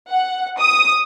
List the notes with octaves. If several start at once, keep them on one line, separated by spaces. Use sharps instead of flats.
F#5
D#6